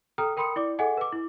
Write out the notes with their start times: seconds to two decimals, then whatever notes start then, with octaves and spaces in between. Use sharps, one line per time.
0.18 A4 G5 A#5 D#6 F6
0.37 A#4 G5 B5 C6 D#6 C#7
0.56 E4 D5 D6
0.79 G#4 A4 D#5 F#5 G#5
0.97 B4 D6
1.13 E4